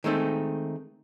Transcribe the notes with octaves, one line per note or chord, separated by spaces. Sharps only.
D#3 G#3 A3 C4 D#4